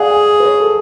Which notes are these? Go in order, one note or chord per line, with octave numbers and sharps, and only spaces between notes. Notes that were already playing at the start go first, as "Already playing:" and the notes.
Already playing: G#4 D5 F5 F#5 G#5
G#5
B4
C#5
A4